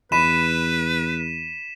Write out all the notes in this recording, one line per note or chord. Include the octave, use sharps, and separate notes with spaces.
E2 B4 B5 B6 D#7 E7